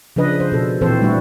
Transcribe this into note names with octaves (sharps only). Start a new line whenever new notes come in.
C#3 F3 D4 B4 D#5
C5
B2 A4
A#2 E3 C4 F#4 A4 C5
G3 A3 D4 E4 F#4